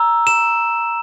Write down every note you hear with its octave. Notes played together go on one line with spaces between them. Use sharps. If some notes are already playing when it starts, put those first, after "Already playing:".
Already playing: A#5 E6
E7